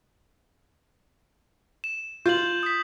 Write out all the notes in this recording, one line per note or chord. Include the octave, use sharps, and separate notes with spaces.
E7
F4 G6 F#7
D#6 B6